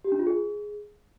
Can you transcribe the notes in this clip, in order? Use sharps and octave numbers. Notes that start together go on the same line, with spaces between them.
G4
D4
F4
G#4